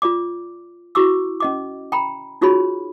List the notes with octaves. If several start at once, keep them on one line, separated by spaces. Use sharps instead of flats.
F4 D5 D6
E4 F#4 C#6 D6 E6
C#4 D#5 D6
G5 A#5 B5
D#4 F4 F#4 G#4 C#5 B5